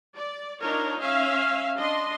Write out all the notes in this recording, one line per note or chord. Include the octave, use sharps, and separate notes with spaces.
D5
D4 D#4 F4 A#4 C#5
C#4 E5 F5
D4 D#5 C6